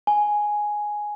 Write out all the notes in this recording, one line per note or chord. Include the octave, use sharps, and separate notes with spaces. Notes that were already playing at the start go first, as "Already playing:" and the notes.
G#5